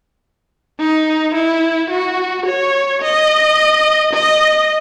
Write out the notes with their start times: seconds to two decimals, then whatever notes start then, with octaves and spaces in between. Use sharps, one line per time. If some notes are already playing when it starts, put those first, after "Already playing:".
0.79 D#4
1.35 E4
1.90 F#4
2.46 C#5
3.02 D#5
4.13 D#5